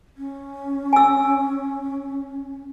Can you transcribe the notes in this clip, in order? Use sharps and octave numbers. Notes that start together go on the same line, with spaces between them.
C#4
G#5 E6